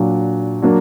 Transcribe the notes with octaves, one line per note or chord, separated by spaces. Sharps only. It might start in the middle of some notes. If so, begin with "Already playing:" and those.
Already playing: A#2 F#3 D4
F#3 A#3 D4